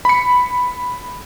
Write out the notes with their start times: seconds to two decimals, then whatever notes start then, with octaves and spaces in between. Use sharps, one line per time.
0.05 B5 C#7